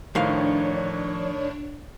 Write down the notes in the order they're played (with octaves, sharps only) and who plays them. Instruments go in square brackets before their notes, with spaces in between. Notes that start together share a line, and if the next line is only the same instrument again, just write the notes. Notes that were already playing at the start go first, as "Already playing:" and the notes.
[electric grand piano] A2 D#3 [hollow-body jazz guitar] F3 F5 [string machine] D4 C#5